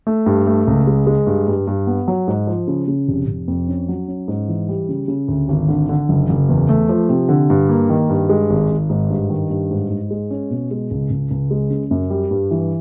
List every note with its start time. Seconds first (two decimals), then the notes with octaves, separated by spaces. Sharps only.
0.07 A3
0.26 G2
0.47 A3
0.67 C#2
0.87 G#3
1.07 G#3
1.27 G2
1.48 G2
1.67 G2
1.87 B3
2.08 F#3
2.28 G#2
2.47 F3
2.68 C#3
2.88 C#3
3.08 F1
3.28 F1
3.48 F2
3.68 C#4
3.88 F#3
4.08 C#4
4.28 G#2
4.48 E3
4.69 G3
4.89 C#3
5.08 C#3
5.28 D2
5.49 G#1
5.69 D3
5.89 D3
6.09 F#1
6.29 F#1
6.49 E2
6.69 A3
6.89 F3
7.09 C3
7.29 D3
7.50 G2
7.69 A#3
7.89 D#3
8.09 G2
8.29 G#3
8.50 G#1
8.70 G#1
8.90 G#2
9.10 G2
9.30 D#3
9.50 G2
9.71 G#2
9.89 G#2
10.11 G#3
10.31 C#4
10.50 B2
10.71 G#3
10.91 C#2
11.10 C#2
11.31 C#2
11.51 G#3
11.70 C#3
11.91 F#2
12.10 G3
12.31 G2
12.51 E3